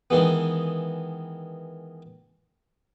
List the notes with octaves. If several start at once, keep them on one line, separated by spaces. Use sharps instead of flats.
D#3 E3 G#3 B3